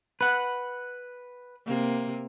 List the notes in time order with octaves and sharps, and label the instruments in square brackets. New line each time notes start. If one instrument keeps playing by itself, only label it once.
[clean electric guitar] B4 F#5
[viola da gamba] C3 A#3